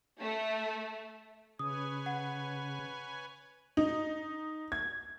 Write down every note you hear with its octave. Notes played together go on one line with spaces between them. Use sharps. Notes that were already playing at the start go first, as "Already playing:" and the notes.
A3
C#3 B4 C#5 G#5 D#6
F#5
D#4
G#6